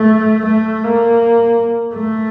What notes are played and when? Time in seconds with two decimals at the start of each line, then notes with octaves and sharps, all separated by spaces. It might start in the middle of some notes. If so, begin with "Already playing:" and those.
Already playing: A3
0.47 A3
0.84 A#3
1.95 A3